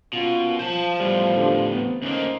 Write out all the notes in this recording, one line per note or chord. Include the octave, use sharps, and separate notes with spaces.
B2 A#3 C#4 F4
F3 C5 A5
E2 A2 G3
D3 G4
B3 C4
D2 A#3 C#4 D#4 C5 D#5